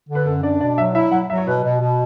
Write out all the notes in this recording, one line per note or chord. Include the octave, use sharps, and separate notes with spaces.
D3
B4
F#2 A4
D4 D5
B2 D5
F#3 E5
E4 E5
F#3 F#5
F#3 E5
C#5
B2 B4
B2
B2